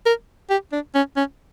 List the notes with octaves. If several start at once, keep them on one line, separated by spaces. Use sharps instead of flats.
A#4
G4
D4
C#4
C#4